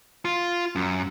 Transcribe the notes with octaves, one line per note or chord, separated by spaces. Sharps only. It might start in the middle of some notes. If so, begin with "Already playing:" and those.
F4
F#2